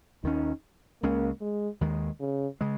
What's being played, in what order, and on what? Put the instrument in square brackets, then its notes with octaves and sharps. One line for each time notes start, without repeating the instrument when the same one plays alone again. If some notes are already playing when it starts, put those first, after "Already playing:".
[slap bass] D#2 D#3 C#4 [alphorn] D#4
[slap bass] C#2 C#3 G#3 C#4 [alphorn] A#3
[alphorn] G#3
[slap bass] D#2 D#3 G#3
[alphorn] C#3
[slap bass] C#3 G#3